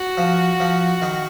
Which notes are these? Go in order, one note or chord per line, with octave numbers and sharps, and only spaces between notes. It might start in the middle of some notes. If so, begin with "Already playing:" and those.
Already playing: F#4
F3
F3
D#3